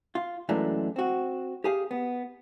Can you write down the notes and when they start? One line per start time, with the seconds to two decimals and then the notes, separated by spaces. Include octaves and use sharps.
0.15 F4
0.49 F#2 E3 G#3 A3 D4
0.96 C4 F#4
1.64 G4 G#4 F5
1.91 B3